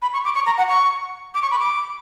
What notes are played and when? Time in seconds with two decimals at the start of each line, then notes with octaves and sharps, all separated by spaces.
0.02 B5
0.13 C#6
0.25 D6
0.35 C#6
0.46 A#5
0.58 F#5
0.68 C#6
1.34 D6
1.42 C#6
1.51 B5
1.59 D6